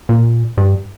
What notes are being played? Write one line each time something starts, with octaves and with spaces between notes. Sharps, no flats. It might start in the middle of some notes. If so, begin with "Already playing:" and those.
A#2
G2